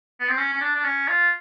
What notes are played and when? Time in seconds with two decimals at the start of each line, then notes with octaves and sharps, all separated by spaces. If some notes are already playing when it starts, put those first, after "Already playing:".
0.20 B3
0.28 C4
0.37 C#4
0.53 C#4
0.61 D4
0.76 D4
0.84 C#4
1.09 F4